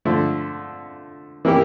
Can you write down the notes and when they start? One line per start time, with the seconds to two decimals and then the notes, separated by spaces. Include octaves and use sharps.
0.05 D3 F3 A3
1.45 E3 A#3 E4 G4